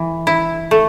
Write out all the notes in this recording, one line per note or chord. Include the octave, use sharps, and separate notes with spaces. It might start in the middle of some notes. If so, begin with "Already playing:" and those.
Already playing: E3
E4
A3